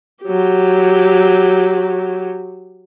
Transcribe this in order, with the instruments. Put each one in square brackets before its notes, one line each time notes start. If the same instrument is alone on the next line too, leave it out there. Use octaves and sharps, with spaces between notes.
[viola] F#3 G4